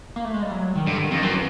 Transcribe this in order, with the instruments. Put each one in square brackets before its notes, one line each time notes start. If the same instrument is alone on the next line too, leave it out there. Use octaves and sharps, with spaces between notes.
[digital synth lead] A#3
A3
G#3
G3
F#3
D#3
[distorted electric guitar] G2 [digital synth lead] D3
[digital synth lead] D#3
[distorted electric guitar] F2
[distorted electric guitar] F#2 [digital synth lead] E3